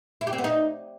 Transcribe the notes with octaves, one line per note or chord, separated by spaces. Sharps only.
E4
G4
C4
B3
D#4